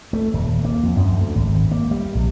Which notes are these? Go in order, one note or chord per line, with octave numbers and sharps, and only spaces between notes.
A3
D#1
A#3
F2
F#2
D2
G#1
A#3
G3
A#1